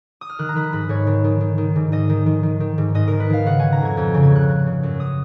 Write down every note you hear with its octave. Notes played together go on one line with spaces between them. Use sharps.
D#6
F6
D#3 F#6
A#5
D#3 B5
G#2 B5
G#2 C#5
D#3
D#3
D#3
D#3
G#2
G#2 D#5
D#3
D#3
D#3
D#3
G#2
G#2 D#5
D#3 A#4
B4
D#3 F5
C#3 F#5
C#3 G#5
A#5
F2 G#6
F2 G#6
C#3
G#6
C#3 F#6
C#3
C#3
F#2
D#6